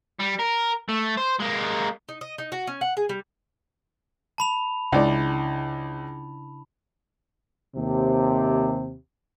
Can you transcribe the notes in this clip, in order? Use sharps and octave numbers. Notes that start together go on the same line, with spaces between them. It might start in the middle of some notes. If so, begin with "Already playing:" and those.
G3
A#4
A3
C5
G#3 A#3
D#4
D#5
D#4
F#4
C#4
F#5
G#4
G3
A5 B5 F7
C#2 C#3 D4 E4 D5
D#2 C3